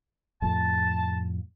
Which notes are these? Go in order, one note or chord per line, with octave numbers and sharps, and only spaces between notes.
F2 A2 A5